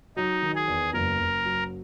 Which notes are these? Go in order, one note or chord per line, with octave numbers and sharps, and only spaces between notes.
F#3 D#4
D#3
G#4
E2
F#1 A#4
F#1
F#3